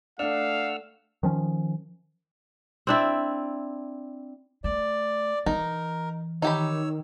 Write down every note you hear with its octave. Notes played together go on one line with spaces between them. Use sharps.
A3 D4 F5 F#5 E6 F6
D#3 F3 C#4
C4 D4 E4
A3 D5
E3 D#4 A#4
D#3 D#4 G4 C#5 B5 E6